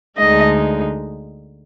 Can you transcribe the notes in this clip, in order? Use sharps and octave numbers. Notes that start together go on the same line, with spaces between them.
D2 D3 G#3 D#4 D#5